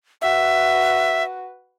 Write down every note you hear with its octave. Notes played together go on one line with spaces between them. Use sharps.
F#4 B4 E5